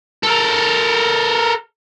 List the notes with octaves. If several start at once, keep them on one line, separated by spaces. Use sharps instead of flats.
A4 A#4